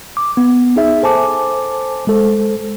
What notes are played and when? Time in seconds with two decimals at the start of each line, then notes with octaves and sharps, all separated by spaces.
0.17 D6
0.37 B3
0.76 D#4 G#4 E5
1.02 A4 C5 G#5 A5 D6
2.07 G#3 A4 C5